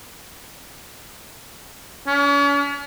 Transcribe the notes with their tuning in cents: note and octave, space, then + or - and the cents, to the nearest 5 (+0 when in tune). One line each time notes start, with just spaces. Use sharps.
C#4 +40